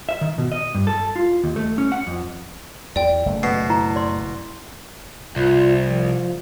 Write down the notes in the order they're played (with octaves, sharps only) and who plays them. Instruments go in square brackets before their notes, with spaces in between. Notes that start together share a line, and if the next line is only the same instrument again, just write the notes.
[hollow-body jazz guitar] E5
D#3
B2
D#5
G2
A4
F4
D#2
A3
C#4
F#5
F2
[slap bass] E2 [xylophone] D5 G5
[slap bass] F#1 A3
[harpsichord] B2 [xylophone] C7
[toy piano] E4 A#5
D5 C6
[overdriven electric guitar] C2 [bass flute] F4
[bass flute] F3